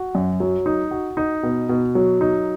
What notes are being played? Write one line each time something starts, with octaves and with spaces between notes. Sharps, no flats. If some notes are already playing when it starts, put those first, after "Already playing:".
Already playing: F#4
F#2
F#3
D#4
F#4
D#4
B2
B2
F#3
D#4